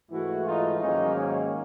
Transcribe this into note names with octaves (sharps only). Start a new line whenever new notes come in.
G#2 E3 A3 E4 F#4
D#4 F4
G#2 D#3 F#3 A#3 C#4 D#4
C#4